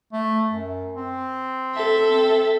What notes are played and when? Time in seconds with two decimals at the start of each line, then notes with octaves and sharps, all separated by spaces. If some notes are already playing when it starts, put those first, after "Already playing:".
0.13 A3
0.51 F#2
0.95 C4
1.75 A4 E5
2.11 C4